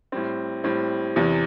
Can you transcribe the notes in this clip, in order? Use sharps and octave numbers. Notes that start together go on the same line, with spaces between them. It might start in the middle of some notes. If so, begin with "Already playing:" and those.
A2 G3 C4
A2 G3 C4
E2 C3 E3